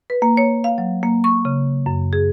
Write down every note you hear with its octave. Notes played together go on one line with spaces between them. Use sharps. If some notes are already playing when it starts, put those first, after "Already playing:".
B4
A#3
C#5
F5
F#3
A#3
C#6
C#3
F#2
G#4